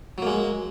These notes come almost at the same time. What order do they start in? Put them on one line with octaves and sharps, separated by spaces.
F#3 A#3 G#3